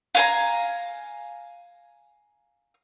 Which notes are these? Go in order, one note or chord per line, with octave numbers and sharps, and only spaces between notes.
F5 G#5 A#5